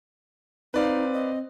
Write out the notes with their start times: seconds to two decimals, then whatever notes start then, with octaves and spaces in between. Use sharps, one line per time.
0.74 C4 D#4 B4 D5 F5
1.13 D#5